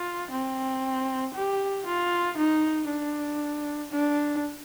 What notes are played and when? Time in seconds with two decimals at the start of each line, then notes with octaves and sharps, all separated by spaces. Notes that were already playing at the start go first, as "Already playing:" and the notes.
Already playing: F4
0.32 C4
1.35 G4
1.86 F4
2.38 D#4
2.89 D4
3.92 D4